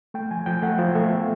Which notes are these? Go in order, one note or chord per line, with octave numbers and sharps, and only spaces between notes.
A3 G5
F3 G#5
F3 G5
A3 F#5
F3 F5
A3 E5
B3